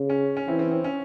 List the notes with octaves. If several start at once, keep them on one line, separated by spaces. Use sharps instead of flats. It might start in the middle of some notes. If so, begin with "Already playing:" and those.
Already playing: C#3
C#4
C#4
E3 C4 E4
C4
C4
C#4